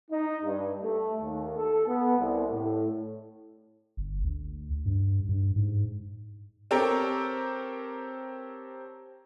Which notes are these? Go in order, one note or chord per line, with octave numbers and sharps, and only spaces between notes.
D#4
G2
A3
D#2
A4
B3
C2
A2
G1
D2
G2
G2
G#2
C4 G4 A4 A#4 C#5